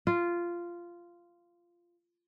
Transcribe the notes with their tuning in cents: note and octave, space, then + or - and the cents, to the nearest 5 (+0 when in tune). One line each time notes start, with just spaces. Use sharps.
F4 -10